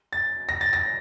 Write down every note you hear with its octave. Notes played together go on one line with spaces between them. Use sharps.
A6
A#6
A6
A#6